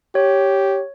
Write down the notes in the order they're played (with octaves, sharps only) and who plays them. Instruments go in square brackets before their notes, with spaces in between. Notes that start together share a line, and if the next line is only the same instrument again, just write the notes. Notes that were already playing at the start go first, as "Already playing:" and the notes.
[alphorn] G4 [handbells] C#5